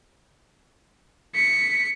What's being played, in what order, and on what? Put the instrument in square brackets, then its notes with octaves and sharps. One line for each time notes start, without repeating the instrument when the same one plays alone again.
[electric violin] B6 C#7